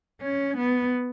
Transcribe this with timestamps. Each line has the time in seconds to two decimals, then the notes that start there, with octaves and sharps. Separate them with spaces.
0.22 C#4
0.57 B3